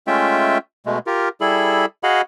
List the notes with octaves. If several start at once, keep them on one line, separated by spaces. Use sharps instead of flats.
G#3 A3 C#4 F4 E5 G5
B2 G#3 A3
F4 G4 A#4
G3 E4 G#4 A4 B5
F#4 G#4 D#5 F5 F#5 B5